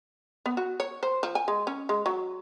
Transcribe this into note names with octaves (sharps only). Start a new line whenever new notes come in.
B3
F#4
C#5
C5
F3
G#5
G#3
C#4
G#3
F#3